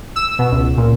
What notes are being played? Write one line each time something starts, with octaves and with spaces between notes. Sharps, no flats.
E6
B2
C#2
A#2